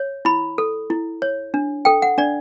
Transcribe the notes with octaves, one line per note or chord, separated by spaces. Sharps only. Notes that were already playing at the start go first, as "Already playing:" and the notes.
Already playing: C#5
E4 B5
A4
E4
C#5
D4
A4 G5
F#5
D4 D5